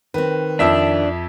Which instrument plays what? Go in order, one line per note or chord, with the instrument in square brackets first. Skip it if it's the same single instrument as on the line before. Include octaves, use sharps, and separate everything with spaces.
[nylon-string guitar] D#3 C4 [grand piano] B4
[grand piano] F2 E5 B6 [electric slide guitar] D4